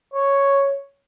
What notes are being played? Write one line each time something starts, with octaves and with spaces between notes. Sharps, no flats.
C#5